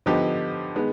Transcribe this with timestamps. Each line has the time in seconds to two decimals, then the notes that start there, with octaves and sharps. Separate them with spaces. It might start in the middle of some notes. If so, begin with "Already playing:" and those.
0.06 D3 F3 B3 D#4 G4
0.75 D#3 G#3 B3